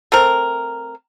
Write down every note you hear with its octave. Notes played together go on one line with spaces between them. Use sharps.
A3 C4 A#4